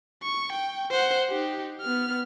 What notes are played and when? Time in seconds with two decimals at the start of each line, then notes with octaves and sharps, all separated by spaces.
0.23 C#6
0.53 G5
0.91 C5 F#5
1.29 D#4 G4
1.82 B3 F6